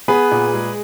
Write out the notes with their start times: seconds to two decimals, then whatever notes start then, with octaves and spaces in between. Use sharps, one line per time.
0.08 B3 G#4 B4
0.31 A#2
0.54 G#3